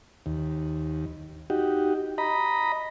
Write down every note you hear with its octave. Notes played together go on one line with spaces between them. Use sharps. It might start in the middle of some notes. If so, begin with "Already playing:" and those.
D#2
D#4 F#4 G4
D#5 A#5 B5